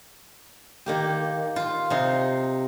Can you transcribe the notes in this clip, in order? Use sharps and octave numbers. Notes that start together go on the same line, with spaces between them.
D#3 A#3 G4
F4
C3 D#4 C6